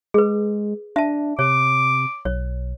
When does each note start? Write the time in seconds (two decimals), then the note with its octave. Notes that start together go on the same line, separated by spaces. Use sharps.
0.14 G#3 G#4 B4
0.96 D4 E5 A5
1.39 C3 C#5 D6
2.25 B1 C#5